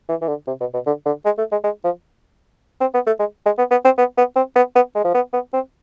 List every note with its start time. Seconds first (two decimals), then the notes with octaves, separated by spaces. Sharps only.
0.09 E3
0.22 E3
0.28 D3
0.47 C3
0.60 B2
0.74 B2
0.86 D3
1.06 D3
1.25 G#3
1.38 A3
1.52 G#3
1.64 G#3
1.84 F3
2.81 C4
2.94 B3
3.07 A3
3.19 G#3
3.46 G#3
3.58 B3
3.71 B3
3.85 C4
3.98 B3
4.17 B3
4.36 C4
4.56 B3
4.75 B3
4.95 G#3
5.04 F3
5.14 B3
5.33 B3
5.53 C4